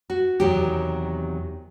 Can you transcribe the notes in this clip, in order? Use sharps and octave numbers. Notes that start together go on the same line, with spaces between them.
F#4
E2 C3 D#3 F#3 G4